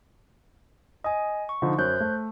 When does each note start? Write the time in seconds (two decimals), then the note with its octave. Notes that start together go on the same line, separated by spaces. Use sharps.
1.04 D#5 G#5 D#6
1.49 C#6
1.62 D3 F3 D#4
1.78 F#2 C5 F#6 G6
2.00 A3